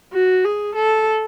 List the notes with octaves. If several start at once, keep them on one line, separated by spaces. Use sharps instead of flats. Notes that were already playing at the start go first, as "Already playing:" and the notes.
F#4
G#4
A4